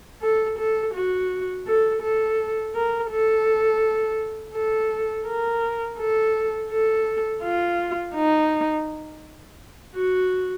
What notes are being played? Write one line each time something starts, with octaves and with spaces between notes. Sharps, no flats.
A4
A4
F#4
A4
A4
A#4
A4
A4
A#4
A4
A4
F4
D#4
F#4